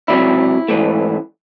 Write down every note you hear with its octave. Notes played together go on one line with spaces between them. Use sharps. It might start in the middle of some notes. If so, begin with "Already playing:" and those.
C#2 C3 F#3 E4
G#2 E3 A3